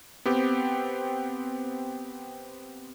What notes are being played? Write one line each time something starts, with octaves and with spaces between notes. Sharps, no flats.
B3 C4 G4